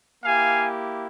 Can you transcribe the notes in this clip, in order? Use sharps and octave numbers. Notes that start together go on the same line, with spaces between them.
A#3 E4 G4 F5 G#5